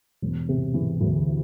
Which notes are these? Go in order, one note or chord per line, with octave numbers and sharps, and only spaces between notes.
E1
C3
E3
D2